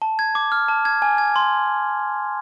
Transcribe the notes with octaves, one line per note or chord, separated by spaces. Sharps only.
A5
G#6
D6
F6
A5
G#6
G#5
G#6
C6